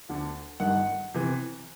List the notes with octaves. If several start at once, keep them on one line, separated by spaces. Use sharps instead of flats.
D2 D3
G1 G2 D#3 F#5
C3 E3